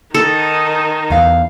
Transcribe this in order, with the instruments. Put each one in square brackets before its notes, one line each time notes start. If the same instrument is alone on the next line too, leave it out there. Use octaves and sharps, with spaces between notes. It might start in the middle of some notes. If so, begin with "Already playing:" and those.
[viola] D#3 D#4 [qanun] A4
[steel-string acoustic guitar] E2 F5